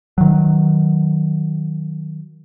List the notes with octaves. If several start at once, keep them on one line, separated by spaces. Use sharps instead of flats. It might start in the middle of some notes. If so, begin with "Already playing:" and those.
D#3 F#3